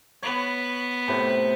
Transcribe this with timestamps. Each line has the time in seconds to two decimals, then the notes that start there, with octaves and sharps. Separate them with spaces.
0.22 B3 B4 C#5
1.08 A2 C3 B4